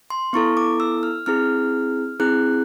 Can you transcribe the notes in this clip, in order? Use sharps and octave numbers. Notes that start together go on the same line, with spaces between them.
C6
B3 E4 A4 C#6
D6
E6
F6
C4 E4 G#4 F6
C4 E4 G#4 F#6